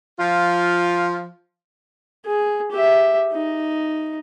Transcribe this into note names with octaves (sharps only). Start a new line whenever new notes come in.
F3 F4
G#4
G4 E5
D#4